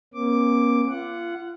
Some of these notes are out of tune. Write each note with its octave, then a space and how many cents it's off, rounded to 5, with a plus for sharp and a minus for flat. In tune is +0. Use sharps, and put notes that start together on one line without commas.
A#3 +35 C#4 -35 D6 +0
F4 -30 F#5 +0